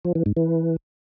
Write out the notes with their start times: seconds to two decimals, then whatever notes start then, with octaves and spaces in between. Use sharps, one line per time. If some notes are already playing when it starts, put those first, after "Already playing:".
0.05 F3
0.15 E3
0.26 G#2
0.37 E3